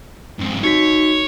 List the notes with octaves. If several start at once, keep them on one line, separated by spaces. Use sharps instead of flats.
F2 G#2
D#4 F#4 C#5 B6